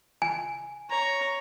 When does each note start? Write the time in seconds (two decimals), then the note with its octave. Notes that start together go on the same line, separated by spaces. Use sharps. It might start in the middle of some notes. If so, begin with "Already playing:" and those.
0.22 G#5
0.90 C#5 A#5